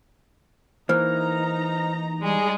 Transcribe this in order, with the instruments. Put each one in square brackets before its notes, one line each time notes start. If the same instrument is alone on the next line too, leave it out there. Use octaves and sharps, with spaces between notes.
[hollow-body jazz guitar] E3 A#3 [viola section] D#4 A#5 [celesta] C5 F6
[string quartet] G3 G#3 G#4